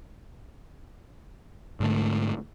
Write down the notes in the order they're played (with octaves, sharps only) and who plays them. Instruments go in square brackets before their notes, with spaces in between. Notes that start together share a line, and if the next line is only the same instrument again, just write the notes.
[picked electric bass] G#2 D3 A3